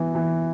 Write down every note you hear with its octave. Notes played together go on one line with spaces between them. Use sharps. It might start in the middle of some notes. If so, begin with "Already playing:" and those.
Already playing: E3 B3
E3